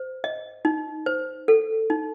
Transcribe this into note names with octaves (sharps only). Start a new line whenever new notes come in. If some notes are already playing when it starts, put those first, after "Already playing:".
Already playing: C5
D#5
D#4
C5
A4
D#4